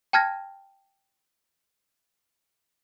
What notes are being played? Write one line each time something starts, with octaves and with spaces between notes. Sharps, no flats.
G5 A5 F6 G#6 A#6